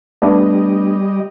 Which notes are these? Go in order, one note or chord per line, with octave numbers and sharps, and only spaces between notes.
G3 A3 B3 D4 D#5